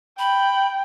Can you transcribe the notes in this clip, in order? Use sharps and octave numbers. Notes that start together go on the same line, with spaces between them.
G5 B5